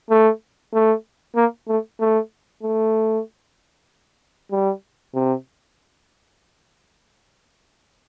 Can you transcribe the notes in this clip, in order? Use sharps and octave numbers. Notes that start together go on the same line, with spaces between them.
A3
A3
A#3
A3
A3
A3
G3
C3